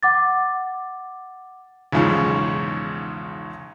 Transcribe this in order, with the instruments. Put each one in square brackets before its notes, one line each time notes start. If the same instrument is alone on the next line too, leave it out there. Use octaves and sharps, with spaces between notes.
[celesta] F#5 D6 A6
[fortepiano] B1 E2 G#2 C#3 F3